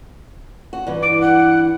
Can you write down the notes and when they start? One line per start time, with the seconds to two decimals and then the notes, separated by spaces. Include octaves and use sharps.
0.73 F#4
0.87 G2 E3
1.02 D6
1.21 F#5